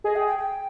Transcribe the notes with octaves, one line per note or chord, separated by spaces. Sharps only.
G#4 D#5
G5
G5
G5